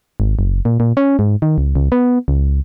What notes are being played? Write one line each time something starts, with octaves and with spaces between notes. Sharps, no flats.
G#1
F#1
A#2
A#2
C#4
G#2
D#3
C#2
C#2
B3
C#2